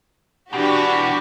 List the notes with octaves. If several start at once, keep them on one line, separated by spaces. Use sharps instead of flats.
B2 E3 D4 F#4 G4